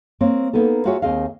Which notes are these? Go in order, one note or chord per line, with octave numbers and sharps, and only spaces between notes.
A#3 C4 C#5
A#3 B3 D#4 A4
F4 F#4 G#4 A#4 C#5 E5
D#2 C4 G#4 D#5 F5